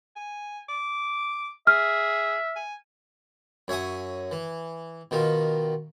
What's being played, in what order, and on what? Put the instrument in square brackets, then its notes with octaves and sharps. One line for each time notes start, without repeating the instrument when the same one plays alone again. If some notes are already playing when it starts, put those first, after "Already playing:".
[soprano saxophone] G#5
D6
[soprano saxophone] G#4 [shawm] E5 [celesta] F6
[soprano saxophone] G#5
[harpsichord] F#2 C#5 E5 G#5 D#6
E3
B2 D#3 F4